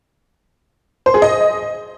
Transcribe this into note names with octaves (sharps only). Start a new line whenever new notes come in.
C5
G#4
D#5